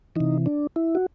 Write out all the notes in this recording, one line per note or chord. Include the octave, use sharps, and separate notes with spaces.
C3 E3 D#4
D4
E4
F#4